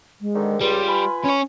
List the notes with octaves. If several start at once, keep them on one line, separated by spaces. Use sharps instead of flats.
G#3
G#2 D3 D#3
C#2 G3 F4
B4 G#5 B5
C#4 C#5